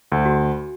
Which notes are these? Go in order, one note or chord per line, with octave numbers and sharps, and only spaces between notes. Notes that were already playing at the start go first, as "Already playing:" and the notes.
D2
F#4